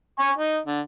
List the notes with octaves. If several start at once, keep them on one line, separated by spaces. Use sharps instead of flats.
G#5 C#6
D#4
D3